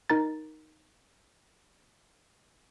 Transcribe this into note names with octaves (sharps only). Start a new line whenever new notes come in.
D#4 A#4 A#5 A6